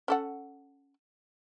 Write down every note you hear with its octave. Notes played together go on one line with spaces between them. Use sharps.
C#4 A4 F#5